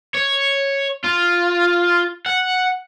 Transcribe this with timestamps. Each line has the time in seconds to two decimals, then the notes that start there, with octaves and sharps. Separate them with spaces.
0.14 C#5
1.04 F4
2.26 F#5